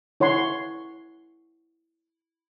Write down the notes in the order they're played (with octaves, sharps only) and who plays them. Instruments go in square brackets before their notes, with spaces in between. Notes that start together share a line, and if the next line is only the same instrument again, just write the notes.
[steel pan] E4 C#5 F#5 C6 C#6